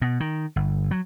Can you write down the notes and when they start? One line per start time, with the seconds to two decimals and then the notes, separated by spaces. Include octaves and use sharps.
0.02 B2
0.20 D#3
0.56 G1
0.91 F#3